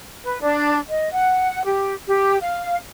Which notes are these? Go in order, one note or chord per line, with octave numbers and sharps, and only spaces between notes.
B4
D4
D#5
F#5
G4
G4
F5